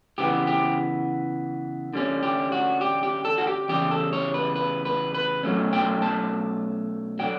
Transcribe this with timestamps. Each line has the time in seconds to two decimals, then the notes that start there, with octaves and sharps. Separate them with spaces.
0.18 C#3 E3 B3 G4
0.47 G4
1.93 D3 G3 C#4
2.23 G4
2.52 F#4
2.81 G4
3.03 G4
3.25 A4
3.38 F#4
3.47 G4
3.69 E2 C#3 G3 G4
3.91 A4
4.13 C#5
4.34 B4
4.56 B4
4.85 B4
5.14 B4
5.43 B2 F#3 A3 C#4
5.73 G5
6.02 A5
7.19 D3 F#3 G5